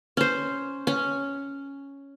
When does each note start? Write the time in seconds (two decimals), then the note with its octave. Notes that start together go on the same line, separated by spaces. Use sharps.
0.17 C#4 C5
0.87 C#4